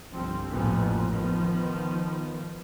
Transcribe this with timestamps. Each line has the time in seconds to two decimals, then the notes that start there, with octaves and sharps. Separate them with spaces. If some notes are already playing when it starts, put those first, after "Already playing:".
0.12 G1 C2 F3 C4
0.51 A1 F2 A#2 F3 B3
1.08 D#3 F3 B3